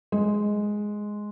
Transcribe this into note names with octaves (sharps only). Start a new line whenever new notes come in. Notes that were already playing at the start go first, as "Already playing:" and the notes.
G#3